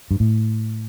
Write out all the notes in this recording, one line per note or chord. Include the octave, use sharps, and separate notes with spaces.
G2
A2